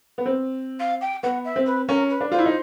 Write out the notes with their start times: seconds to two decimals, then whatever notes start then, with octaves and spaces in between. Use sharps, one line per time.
0.18 B3
0.26 C4
0.79 F5
1.01 G5
1.23 B3 F#5
1.45 E5
1.56 C4
1.66 B4
1.88 C#4 A#4
2.10 B4
2.21 D4
2.32 F4 C5
2.39 E4
2.46 D#4